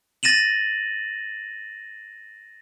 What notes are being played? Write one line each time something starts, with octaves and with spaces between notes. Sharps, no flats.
A6 A#6 D#7 E7 F#7